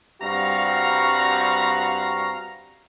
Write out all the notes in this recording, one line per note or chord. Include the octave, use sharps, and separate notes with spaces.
G2 G3 C4 F#4 F5 A#5